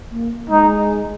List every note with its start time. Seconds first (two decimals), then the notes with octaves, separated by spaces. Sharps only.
0.11 A#3
0.49 G#3 D#4